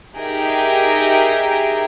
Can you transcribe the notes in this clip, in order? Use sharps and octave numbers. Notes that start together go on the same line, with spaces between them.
D#4 G4 G#4 A#4 E5 G5